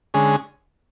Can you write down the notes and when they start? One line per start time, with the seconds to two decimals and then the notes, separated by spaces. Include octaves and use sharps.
0.14 D3 G#3 C#4 G#4